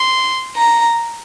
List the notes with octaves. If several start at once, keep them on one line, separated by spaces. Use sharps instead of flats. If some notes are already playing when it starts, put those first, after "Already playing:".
Already playing: C6
A#5